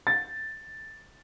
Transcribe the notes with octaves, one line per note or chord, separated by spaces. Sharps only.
A6